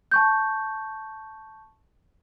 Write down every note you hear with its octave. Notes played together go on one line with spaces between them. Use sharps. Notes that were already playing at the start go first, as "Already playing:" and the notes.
A5 C#6 G6